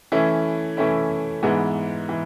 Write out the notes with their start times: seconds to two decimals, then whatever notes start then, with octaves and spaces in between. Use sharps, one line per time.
0.12 E3 A3 C#4 E4
0.77 E3 A3 C#4 E4
1.43 G#2 E3 G#3 B3
2.09 E3